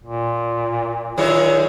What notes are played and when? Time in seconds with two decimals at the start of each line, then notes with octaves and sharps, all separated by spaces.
0.04 A#2
1.17 D3 D#3 F#3 F4 G#4 C#5